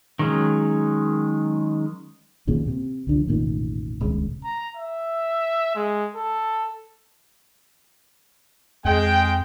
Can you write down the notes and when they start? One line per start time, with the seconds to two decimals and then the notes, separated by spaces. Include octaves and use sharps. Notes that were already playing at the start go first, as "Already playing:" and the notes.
0.19 D#3 F#3 G#3 C#4
2.47 A#1 D#2 A#2 C#3
2.67 C3
3.07 C#2 D3 F3
3.27 E1 A1 A#2 D#3
4.01 D#1 C#2 C#3 C#4
4.44 A#5
4.77 E5
5.76 G#3
6.15 A4
8.85 F2 G#3 G5